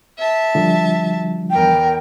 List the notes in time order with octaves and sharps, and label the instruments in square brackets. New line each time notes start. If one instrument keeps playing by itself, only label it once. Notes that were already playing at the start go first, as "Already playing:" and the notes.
[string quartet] E5 A5
[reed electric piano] D3 F3 G3
[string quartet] E2 A#4 [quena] G5